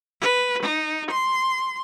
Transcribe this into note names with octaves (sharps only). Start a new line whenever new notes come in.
B4
D#4
C6